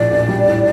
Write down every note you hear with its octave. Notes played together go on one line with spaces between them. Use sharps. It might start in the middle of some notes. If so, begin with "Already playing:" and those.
Already playing: A#1 A2 D5
A#1
G3
A2